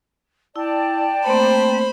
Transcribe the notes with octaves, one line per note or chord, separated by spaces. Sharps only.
E4 D5 G5 A5
A3 A#3 C4 C5 B5